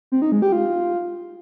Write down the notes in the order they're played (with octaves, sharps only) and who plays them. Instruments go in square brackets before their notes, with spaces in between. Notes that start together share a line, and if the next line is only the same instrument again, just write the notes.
[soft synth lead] C4
D#4
G#3
G4
F4